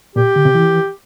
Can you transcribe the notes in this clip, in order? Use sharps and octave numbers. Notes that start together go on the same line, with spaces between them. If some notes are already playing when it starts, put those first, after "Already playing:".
A#2 G4
D3
C3
E3